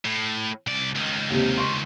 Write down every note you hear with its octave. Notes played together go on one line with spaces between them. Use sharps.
A2
C2 D5
C#2 D#3
D#2 C3
C6 C#6